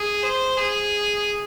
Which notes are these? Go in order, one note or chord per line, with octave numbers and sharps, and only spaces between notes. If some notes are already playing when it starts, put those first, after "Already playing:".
Already playing: G#4
C5
G#4